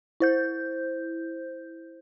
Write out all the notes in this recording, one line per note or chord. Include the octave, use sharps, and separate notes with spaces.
E4 C5 G6